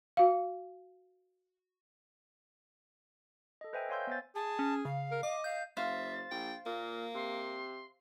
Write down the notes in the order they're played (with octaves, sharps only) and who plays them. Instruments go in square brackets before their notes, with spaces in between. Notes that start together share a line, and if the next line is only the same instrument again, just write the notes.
[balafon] F#4 F5
[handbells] A4 D#5
B4 C5 D#5 E5 G5 G#5
C#5 F5 G#5 C6 E6 G6
B3 C5 A6
[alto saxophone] G#4 [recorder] A5
[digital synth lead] C#4
[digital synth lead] C#3 [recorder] F5
[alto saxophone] A#4
[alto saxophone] D#5 [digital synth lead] D6
[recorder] F5 [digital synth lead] G6
[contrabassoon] F#1 [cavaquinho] C5 F5 [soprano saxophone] E5 [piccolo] A6
[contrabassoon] A#1 [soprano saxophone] G5
[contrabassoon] A#2 [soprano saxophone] A#3
[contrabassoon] C3 [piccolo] C6